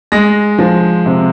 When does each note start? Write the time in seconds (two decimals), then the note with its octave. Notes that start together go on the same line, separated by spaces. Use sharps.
0.12 G#3 A#6
0.59 F3
1.06 C3